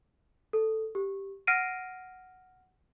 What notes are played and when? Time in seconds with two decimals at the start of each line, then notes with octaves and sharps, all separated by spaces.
0.53 A4
0.95 G4
1.47 F#5 F6 A#6 C7 D7 D#7